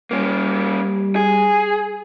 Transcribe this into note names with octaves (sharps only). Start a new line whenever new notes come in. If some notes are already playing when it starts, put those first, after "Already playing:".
G3 A#3 C#4
G#4